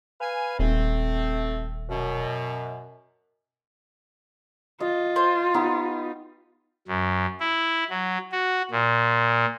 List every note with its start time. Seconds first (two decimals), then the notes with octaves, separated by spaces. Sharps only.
0.21 B4 F5 G#5
0.59 D#1 A3 C4
1.89 F#2 B2
4.80 F4 D#5
5.16 C5
5.54 B3 D#4 G4
6.88 F#2
7.40 E4
7.90 F#3
8.32 F#4
8.71 A#2